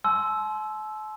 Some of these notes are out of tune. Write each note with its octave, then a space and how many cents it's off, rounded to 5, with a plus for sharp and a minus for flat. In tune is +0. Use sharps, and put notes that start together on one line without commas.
A5 -45 C6 +0 E6 +0